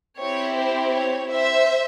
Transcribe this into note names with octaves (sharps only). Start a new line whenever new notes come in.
C4 E4 G4 C#5
C5
C#5
C5 E5